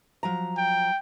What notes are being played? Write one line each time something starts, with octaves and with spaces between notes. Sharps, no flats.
F3 F#3 A#5
G5